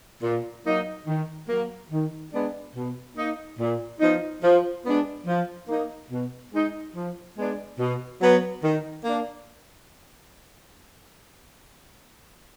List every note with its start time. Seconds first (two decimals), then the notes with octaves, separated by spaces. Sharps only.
0.23 A#2
0.65 F#3 A#3 D#4
1.07 D#3
1.49 F#3 A#3
1.91 D#3
2.33 G#3 B3 D4
2.75 B2
3.17 A#3 D#4
3.59 A#2
4.00 F3 B3 D#4
4.43 F3
4.85 G#3 B3 D4
5.27 F3
5.69 A#3 D#4
6.11 B2
6.53 G#3 D#4
6.95 F3
7.37 G#3 B3 D4
7.79 B2
8.21 F#3 B3
8.63 D#3
9.05 A#3 D4